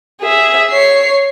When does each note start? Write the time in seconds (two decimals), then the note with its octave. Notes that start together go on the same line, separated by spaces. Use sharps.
0.21 G#4 E5
0.70 C#5 C7